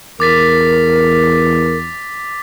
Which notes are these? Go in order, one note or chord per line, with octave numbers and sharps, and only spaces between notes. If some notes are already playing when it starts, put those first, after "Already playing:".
E2 A#4 D6 A6 B6